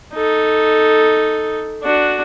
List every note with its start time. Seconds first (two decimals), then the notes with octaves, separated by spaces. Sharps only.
0.14 D#4 A4
1.83 D4 F#4